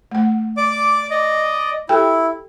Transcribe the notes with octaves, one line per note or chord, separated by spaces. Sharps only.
A3 F#5
D5 D6
D5 D#5
E4 G4 A4 G5